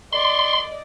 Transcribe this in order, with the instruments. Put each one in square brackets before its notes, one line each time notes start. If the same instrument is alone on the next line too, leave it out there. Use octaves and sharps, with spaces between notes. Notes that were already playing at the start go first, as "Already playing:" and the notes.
[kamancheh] D5 D#5 [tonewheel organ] C6